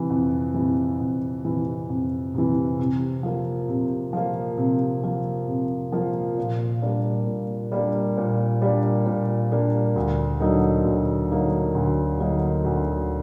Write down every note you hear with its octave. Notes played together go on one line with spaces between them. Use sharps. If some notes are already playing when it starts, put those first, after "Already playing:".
Already playing: C3 E3
F2
C3 E3
F2
C3 E3
F2
C3 E3
C3
F3 A#3
C3
F3 A#3
C3
F3 A#3
C3
F3 A#3
A#2
G3 A#3 D4
A#2
G3 A#3 D4
A#2
G3 A#3 D4
A#2
G3 A#3 D4
D2
D3 F#3 A#3 D#4
D2
D3 F#3 A#3 D#4
D2
D3 F#3 A#3 D#4
D2